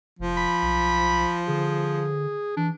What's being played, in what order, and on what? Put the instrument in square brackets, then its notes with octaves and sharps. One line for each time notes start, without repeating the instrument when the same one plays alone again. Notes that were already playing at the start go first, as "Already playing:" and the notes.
[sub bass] F1 [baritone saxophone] F3
[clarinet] B5
[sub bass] B1
[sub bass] D3 [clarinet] G#4
[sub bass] E3 [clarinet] D4